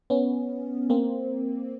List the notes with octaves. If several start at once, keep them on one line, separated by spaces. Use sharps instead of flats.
B3 C#4
A#3 C4